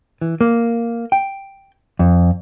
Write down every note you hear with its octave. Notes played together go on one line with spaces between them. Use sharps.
E3
A#3
G5
F2